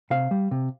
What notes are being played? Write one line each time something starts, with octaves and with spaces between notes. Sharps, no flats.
C3 F5
G3
C3